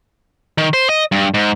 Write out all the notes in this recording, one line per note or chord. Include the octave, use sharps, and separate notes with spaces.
D#3
C5
D#5
G2
G#2